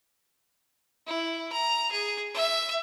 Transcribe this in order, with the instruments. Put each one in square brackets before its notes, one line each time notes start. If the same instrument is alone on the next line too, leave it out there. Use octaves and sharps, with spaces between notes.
[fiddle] E4
A#5
G#4
E5